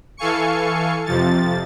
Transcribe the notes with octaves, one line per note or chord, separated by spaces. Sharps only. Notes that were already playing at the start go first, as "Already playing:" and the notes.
E3 A4 F5 G#5 C#6 C#7
F2 C3 F3 A6